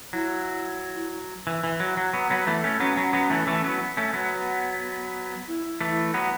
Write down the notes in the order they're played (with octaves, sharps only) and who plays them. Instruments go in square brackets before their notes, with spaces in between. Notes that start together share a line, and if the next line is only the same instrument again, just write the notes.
[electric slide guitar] F#3 [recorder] E4
[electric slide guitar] E3
E3
F#3
F#3
F#3 B3
F#3 B3
E3 A3
A3 C#4
[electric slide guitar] F#3 B3 [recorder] C#4
[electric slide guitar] F#3
F#3 B3
E3 A3
E3 A3
F#3 B3
A3 C#4
F#3 B3
[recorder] E4
[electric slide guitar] E3 A3
F#3 B3